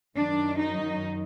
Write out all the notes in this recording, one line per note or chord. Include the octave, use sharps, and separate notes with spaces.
F#2 D#3 F#3 D4
D#4